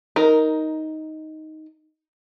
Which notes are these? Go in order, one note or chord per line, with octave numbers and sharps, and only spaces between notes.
D#4 A#4